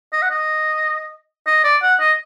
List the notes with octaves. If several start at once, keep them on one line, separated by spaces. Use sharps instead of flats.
D#5
F#5
D#5
D#5
D5
F#5
D#5